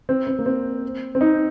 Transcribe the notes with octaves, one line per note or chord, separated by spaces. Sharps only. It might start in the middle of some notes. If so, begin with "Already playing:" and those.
C4
C4
A#3
C4
C4
D#4